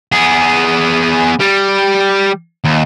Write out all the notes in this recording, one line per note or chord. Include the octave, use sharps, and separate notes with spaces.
B3 G#4
G3
D#2